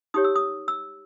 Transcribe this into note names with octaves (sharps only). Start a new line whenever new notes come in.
D#4 G4 C#5 D#6
E6
D#6
E6